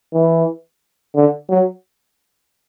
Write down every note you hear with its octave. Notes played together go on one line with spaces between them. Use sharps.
E3
D3
F#3